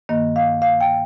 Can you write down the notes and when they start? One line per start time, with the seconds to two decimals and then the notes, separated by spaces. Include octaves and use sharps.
0.09 G2 D#3 A#3 D#5
0.36 F5
0.62 F5
0.81 G5